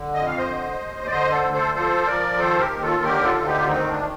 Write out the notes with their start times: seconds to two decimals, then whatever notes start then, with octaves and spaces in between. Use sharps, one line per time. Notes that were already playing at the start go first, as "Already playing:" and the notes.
Already playing: D3
0.14 F2 D#5
0.27 F5
0.38 C5 D#5
0.47 D3
0.79 D#2
1.06 D5
1.10 D3 C5 D#5
1.32 A4 C5
1.43 D2
1.53 A4 C5
1.75 F3 A4 C5
2.07 F3 A#4 D5
2.39 D#3 A4 C5
2.60 G4 A#4
2.71 D#2
2.81 F4 A4
3.03 D3 G4 A#4
3.24 F4 A4
3.35 D2
3.46 D#4 G4
3.58 F4
3.67 D#3 C4 D#4
3.89 D4